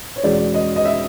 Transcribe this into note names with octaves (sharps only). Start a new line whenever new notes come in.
C#5
E2 B2 G#3 C#4 D5
D#5
D#5
E5